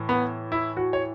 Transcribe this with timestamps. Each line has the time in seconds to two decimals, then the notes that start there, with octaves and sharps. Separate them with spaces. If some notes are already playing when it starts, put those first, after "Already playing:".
Already playing: A2 E3
0.09 B3
0.52 E4
0.77 F#4
0.93 C#5